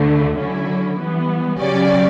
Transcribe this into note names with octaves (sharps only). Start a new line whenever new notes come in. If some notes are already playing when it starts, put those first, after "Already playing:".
Already playing: D2 D3 A3
D3 F#3 C#4 E4
E3 G3 B3
C#3 F#3 C#4 G4 D5